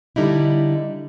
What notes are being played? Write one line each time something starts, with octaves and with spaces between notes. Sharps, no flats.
D3 G3 D#4 E4